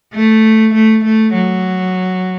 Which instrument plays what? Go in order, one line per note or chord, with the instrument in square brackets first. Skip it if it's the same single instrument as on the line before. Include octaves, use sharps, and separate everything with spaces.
[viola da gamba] A3
A3
A3
F#3